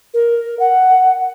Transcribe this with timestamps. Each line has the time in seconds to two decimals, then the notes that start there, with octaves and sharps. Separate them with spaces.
0.14 A#4
0.59 F#5